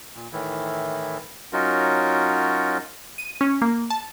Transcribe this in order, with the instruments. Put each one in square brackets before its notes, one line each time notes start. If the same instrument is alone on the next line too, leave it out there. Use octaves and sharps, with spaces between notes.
[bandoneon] A#2
A2 D#3 E3 E4
F#3 C#4 D#4 F4 F#4 A#4
[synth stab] D#7
C#4
A#3
A5